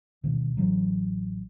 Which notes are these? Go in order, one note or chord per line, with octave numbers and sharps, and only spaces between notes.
D2 B2 D#3
A1 E3 F#3